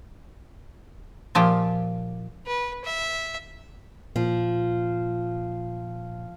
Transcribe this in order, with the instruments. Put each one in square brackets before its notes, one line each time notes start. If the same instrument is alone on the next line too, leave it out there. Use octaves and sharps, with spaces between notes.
[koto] A#2 F3 G4
[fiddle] B4
E5
[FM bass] A#2 [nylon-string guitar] F3